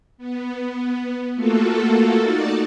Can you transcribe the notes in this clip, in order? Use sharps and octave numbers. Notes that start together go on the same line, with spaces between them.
B3
A3 A#3 F4 F#4 A4
D#4 F#4 D5 A5